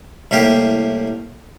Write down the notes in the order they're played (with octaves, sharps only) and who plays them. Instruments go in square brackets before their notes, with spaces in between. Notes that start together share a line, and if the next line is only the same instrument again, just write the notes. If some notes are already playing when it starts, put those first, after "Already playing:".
[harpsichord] C2 A2 A#3 G4 A#4